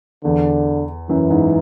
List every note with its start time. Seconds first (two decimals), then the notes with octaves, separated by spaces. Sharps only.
0.24 E2 D3
1.09 F#2 E3
1.30 G#2